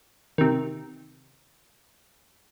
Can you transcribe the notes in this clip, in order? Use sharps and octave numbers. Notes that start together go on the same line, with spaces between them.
C3 D#3